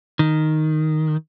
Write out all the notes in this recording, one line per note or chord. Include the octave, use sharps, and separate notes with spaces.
D#3